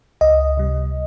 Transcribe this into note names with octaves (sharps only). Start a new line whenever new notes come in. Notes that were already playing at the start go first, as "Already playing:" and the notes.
C#2 D#5
C3 G3